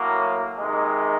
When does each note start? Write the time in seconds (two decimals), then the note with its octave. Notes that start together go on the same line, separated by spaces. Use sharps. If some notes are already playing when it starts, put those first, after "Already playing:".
Already playing: A2 F#3 A#3
0.58 C3 D#3 G#3